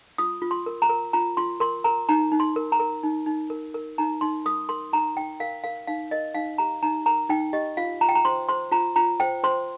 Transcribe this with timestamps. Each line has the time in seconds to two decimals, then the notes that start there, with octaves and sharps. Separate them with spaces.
0.18 F4 D#6
0.42 F4
0.51 C6
0.66 A#4
0.82 A#5
0.90 A#4
1.13 F4 A#5
1.37 F4 C6
1.60 A#4 C6
1.84 A#4 A#5
2.09 D#4 A#5
2.32 D#4
2.40 C6
2.56 A#4
2.72 A#5
2.80 A#4
3.04 D#4
3.26 D#4
3.50 A#4
3.74 A#4
3.98 D#4 A#5
4.21 D#4 C6
4.45 A#4 D#6
4.69 A#4 C6
4.93 D#4 A#5
5.16 D#4 G5
5.40 A#4 F5
5.64 A#4 F5
5.88 D#4 F5
6.11 A#4 D#5
6.34 D#4 F5
6.58 G4 A#5
6.83 D#4 A#5
7.06 A#4 A#5
7.29 D#4 G5
7.53 G4 D#5
7.77 F4 F5
8.01 F4 A#5
8.09 G5
8.15 A#5
8.25 C5 C6
8.49 C5 C6
8.72 F4 A#5
8.96 F4 A#5
9.20 C5 G5
9.43 C5 C6